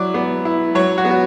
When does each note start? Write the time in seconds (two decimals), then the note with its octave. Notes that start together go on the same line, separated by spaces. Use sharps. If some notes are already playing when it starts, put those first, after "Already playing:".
Already playing: F#3 E4 D5
0.14 B3
0.45 E4
0.75 F#3 C#5
0.98 F#4
1.05 B3
1.11 F#4